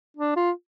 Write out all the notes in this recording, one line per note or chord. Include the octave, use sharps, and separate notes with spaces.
D4
F4